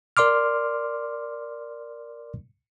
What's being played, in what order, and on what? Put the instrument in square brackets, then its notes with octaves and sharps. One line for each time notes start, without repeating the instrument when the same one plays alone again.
[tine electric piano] A#4 D5 C6 D6 F6